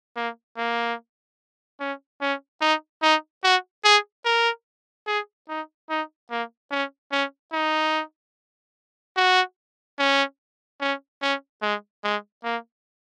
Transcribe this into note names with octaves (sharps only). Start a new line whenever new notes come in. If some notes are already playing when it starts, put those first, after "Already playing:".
A#3
A#3
C#4
C#4
D#4
D#4
F#4
G#4
A#4
G#4
D#4
D#4
A#3
C#4
C#4
D#4
F#4
C#4
C#4
C#4
G#3
G#3
A#3